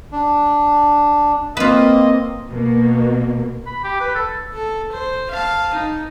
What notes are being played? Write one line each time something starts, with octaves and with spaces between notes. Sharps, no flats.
D4
A#3 C4 F4 B4 D#5
B2 A#3
B5
G4
B4
A4
A4
C5
F5 A5
D#4